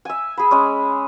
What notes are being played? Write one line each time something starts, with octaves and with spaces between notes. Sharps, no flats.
E5 G#5
G#4 B5
G#3 C#4